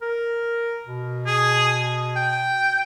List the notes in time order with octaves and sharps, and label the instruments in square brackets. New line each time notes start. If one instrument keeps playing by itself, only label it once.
[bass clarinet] A#4
B2
[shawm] G#4
G5